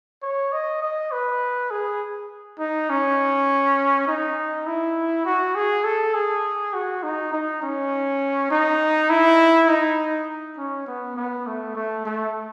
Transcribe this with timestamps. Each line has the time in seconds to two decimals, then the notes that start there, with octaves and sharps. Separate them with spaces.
0.23 C#5
0.53 D#5
0.82 D#5
1.12 B4
1.71 G#4
2.59 D#4
2.90 C#4
4.08 D#4
4.67 E4
5.26 F#4
5.55 G#4
5.84 A4
6.14 G#4
6.74 F#4
7.03 D#4
7.33 D#4
7.62 C#4
8.51 D#4
9.10 E4
9.68 D#4
10.58 C#4
10.87 B3
11.17 B3
11.47 A3
11.76 A3
12.05 A3